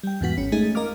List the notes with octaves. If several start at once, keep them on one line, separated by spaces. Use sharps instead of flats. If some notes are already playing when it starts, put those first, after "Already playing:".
G3 G5
E2 G#2 B3 F#4 B6
G#1 C#4
G#3 A3 D#4 G#4
A#4 D#5 F5 D6 F6